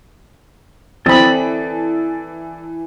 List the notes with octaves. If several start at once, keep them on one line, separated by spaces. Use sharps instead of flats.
E3 C4 A4 D5 B5 D#6